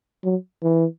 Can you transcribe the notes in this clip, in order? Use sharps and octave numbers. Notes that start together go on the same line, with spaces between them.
F#3
E3